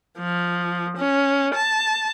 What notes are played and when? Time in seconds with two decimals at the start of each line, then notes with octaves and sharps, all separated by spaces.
0.18 F3
0.96 C#4
1.53 A5